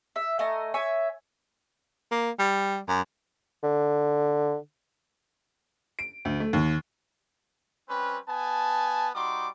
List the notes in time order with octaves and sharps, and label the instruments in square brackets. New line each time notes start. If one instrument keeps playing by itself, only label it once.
[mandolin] E5
A3 D#5 G#5 A#5
C#5 E5 G#5
[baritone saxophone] A#3
G3
F#2
[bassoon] D3
[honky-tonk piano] D7
D2
A3
D#2
[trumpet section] G3 C4 C#4 B4
B3 G#5 A5
G3 D#4 F#4 C6 D6